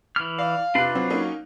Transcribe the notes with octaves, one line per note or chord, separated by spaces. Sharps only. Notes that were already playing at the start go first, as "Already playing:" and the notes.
E3 F6
D5 F5
C3 D4 F4 B4 F#6
F#3 C4
A#3 C#4 D#4